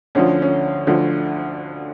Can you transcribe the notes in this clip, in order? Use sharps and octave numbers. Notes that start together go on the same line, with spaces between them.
D2 D3 F3 C#4
C#4
D2 D3 F3